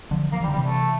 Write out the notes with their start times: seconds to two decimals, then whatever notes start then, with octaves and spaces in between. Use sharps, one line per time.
0.11 D3 F3
0.32 F3 A#3
0.40 E3 G3
0.48 D3
0.53 G3
0.56 C3 E3
0.63 A3